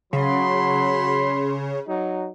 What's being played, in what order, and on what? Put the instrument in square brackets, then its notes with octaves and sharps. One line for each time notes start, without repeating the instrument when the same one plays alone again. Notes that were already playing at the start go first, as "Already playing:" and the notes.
[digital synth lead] C#3 [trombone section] F#3 [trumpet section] B5 C6
[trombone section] F#3 D#4